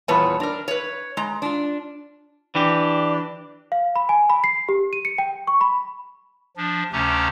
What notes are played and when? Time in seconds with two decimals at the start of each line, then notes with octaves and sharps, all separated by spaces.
0.08 E2 A#2 G3 B4 C#5 A5
0.40 D4 A#4
0.68 B4 C#5
1.17 G#3 A#5
1.42 D4 F4
2.55 E3 D4 G4
3.72 F5
3.96 B5
4.09 G#5
4.30 B5
4.44 C7
4.69 G4
4.93 D#7
5.05 C#7
5.18 G5
5.47 C#6
5.61 B5
6.57 F3 D4
6.92 D2 C3 A3 C#4 G4 A#5